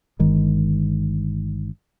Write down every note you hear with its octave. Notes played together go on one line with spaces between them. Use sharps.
G1 D#3 G#3